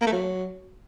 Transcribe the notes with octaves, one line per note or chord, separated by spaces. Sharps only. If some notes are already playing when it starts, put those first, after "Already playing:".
A#3
A3
F#3